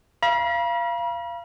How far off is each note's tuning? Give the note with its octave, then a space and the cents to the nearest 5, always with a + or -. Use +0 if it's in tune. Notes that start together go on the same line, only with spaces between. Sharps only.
F5 -25 B5 -45